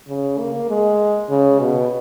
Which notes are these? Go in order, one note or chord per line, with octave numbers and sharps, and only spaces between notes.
C#3
A#3
G#3
C#3
B2